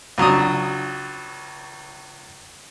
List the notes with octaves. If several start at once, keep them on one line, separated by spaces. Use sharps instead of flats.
C#2 F#3 D4 D#6